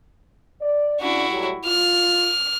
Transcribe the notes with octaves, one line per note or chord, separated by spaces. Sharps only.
D5
C#3 C#4 D4 E4 F#4
A2 F#3 G3
F4 F6